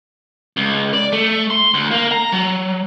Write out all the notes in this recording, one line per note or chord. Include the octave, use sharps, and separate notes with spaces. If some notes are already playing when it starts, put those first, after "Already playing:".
C#2
D5
A3
C6
D2
A#3
A#5
F#3